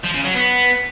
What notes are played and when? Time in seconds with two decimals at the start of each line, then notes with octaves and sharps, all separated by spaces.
0.04 F3
0.14 C#3
0.24 F#3
0.35 B3